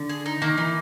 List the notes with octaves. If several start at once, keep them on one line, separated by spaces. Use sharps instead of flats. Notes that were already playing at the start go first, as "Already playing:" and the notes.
Already playing: D3
G#4
D#4
D#3 A#3
E3 D#4